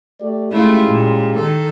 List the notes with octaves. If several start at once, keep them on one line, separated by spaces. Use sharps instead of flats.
A3 G4 D5
G#3 A3 C#4 E4 F4 G4
A#2
D#3 A4